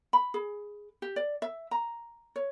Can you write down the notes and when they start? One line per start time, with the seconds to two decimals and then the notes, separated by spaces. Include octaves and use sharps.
0.13 B5
0.34 G#4
1.02 G4
1.16 D5
1.42 E5
1.71 A#5
2.36 C#5